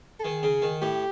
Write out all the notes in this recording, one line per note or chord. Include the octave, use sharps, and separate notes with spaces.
A4
D#3 G#4
C#3
D#3
A2 G4